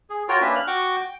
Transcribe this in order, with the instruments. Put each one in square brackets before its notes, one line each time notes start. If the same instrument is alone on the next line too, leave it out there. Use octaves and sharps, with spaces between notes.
[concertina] G#4
F4 F#4 A#4 C#5 G5
A#3 C#4 D4 G4 B4 E5
F6 F#6
F#4 F#5 G5 C#6 D6
G5